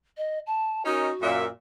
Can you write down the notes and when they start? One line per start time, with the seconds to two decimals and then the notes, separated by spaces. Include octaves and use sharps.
0.17 D#5
0.46 A5
0.85 C#4 D#4 F#4 A#4
1.22 F#2 A#2 E5